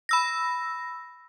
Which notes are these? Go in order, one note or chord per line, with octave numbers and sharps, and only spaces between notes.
B5 E6 A#6